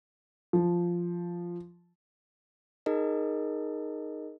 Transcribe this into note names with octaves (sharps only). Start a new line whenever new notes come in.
F3
D#4 G#4 A#4 D#5